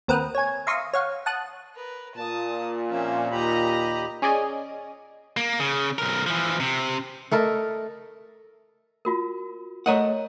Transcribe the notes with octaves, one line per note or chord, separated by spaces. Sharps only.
D#2 C4 A#4 B4 F#5 D#6
C#5 G#5
E5 F5 A#5 C6 C#6 D#6
C#5 F5 F#5
F#5 A5 D#6 F#6
A#4 B4
A#2 A5 D#6
F3 A#3 C4 C#4 E5
D#2 G4 D#5 A#5 B5
C#4 G#4 D5 D#5 G#5
A#3
C#3
B1 A#4
E3 F3
C3
A3 A4 A#4 D#5
F4 F#4 A#4
A3 A#4 C#5 D#5 F#5 A#5